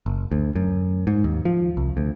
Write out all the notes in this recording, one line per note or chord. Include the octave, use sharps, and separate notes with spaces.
F#1
D2
F#2
G#2
D#2
F3
C2
D2